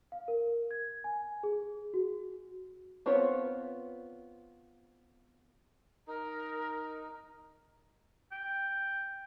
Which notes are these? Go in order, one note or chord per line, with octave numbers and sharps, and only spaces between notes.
F5
A#4
G#6
G#5
G#4
F#4
B3 C4 F4 C5 C#5
D#4 A#4
G5